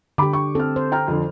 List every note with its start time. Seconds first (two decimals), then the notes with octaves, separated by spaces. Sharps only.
0.18 D3 G4 B5 D6
0.33 C#6
0.55 C4 A4 F6
0.76 C5
0.92 G5 A#5 F6
1.08 F2 D3